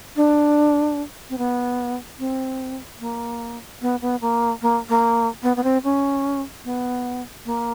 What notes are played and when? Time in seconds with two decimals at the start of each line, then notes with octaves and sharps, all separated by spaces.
0.16 D4
1.30 C4
1.38 B3
2.19 C4
3.00 A#3
3.81 B3
4.02 B3
4.21 A#3
4.62 A#3
4.89 A#3
5.43 B3
5.56 B3
5.63 C4
5.84 C#4
6.64 B3
7.45 A#3